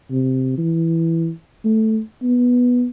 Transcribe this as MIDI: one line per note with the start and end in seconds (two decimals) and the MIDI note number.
0.11 0.54 48
0.58 1.30 52
1.64 2.00 57
2.23 2.86 59